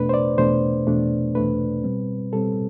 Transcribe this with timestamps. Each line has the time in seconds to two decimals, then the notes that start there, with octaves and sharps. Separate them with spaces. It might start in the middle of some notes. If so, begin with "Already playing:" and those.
Already playing: E2 B2 A3 D4 B4
0.09 C5
0.14 D5
0.38 E2 B2 A3 D4 C5
0.87 E2 B2 A3 D4
1.35 E2 B2 A3 D4 B4
1.84 B2 G3 C4
2.33 B2 G3 C4 A4